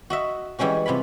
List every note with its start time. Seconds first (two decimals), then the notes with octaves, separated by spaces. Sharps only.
0.10 F#4 D#5 E5
0.59 E3 G3 G#3 C#4 F#4
0.86 C3 F4 G#5 B5